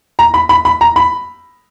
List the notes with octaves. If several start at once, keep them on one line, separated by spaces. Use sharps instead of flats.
A#5
B5
B5
B5
A#5
B5